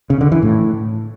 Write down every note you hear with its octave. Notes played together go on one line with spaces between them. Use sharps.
C#3
D3
E3
A2